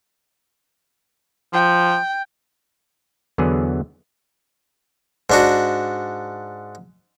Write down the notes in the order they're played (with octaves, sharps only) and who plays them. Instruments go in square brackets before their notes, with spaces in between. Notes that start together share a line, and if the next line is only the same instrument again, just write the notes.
[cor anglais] F3 [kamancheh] G5
[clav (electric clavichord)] E2 D3 E3 F#3 B3 G#4
[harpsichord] G#2 D4 F#4